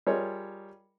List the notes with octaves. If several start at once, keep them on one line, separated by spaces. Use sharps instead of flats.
G3 F4 G#4 A#4 C#5 D#5